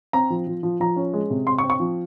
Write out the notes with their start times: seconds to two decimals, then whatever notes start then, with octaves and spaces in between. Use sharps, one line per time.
0.13 C4 A#5
0.30 F3
0.47 F3
0.63 F3
0.80 F3 A#5
0.96 C#4
1.14 G#3
1.30 C3
1.47 C4 C6
1.59 C#6
1.63 C4
1.70 C#6
1.80 F3